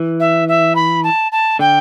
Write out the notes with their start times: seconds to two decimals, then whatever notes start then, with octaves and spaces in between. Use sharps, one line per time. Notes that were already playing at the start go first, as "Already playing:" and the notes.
Already playing: E3
0.20 E5
0.48 E5
0.75 B5
1.03 A5
1.32 A5
1.59 D3 G5